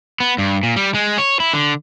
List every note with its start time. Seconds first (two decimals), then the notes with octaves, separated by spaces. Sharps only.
0.20 B3
0.38 G2
0.63 A#2
0.76 G3
0.94 G#3
1.18 C#5
1.40 E4
1.53 D3